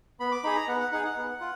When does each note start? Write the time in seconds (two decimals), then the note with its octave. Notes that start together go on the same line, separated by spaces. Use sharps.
0.20 B3 B5
0.32 D6
0.44 D#4 G#4 B5
0.55 A#5
0.68 B3 F#5
0.80 F#5
0.92 D#4 G#4 F#5
1.04 F#5
1.16 B3
1.41 F4